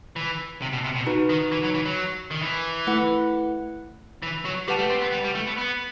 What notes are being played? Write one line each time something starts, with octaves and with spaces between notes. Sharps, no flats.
E3
C3
B2
C3
B2
D#4 F#4 B4
D#3
E3
F#3
E3
F#3
D#3
E3
A3 E4 B4 F#5
E3
F#3
G3 G4 B4 F#5 A5
A3
C4
B3
G3
G3
A3
B3
B3